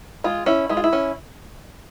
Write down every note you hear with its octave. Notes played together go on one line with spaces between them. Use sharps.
G#3 F4
C#4 E4
G#3 E4
F4
E4
C#4